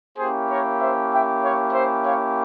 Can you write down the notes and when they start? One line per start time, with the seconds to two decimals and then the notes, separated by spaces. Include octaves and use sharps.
0.17 A#3 C#4 E4 G4 G#4 C5
0.49 A#4 C#5
0.80 C5 E5
1.12 E5 G5
1.42 C#5 F5
1.73 C5 E5
2.05 C#5 F5